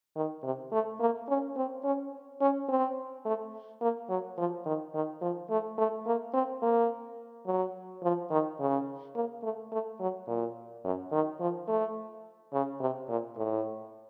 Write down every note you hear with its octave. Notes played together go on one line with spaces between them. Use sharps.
D#3
C3
A3
A#3
C#4
C4
C#4
C#4
C4
A3
A#3
F#3
F3
D#3
D#3
F3
A3
A3
A#3
C4
A#3
F#3
F3
D#3
C#3
A#3
A3
A3
F#3
A#2
F#2
D#3
F3
A3
C#3
C3
A#2
A2